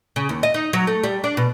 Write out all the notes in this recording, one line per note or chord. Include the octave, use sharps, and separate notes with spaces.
C#3
D#2
D#5
D#4
F#3
A3
G3
D4
B2